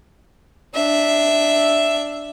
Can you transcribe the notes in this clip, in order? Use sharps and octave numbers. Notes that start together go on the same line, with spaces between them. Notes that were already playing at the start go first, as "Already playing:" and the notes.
D4 E5